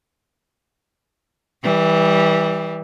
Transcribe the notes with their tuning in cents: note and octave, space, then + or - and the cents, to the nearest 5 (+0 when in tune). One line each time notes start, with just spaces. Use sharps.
E3 -20 G3 +5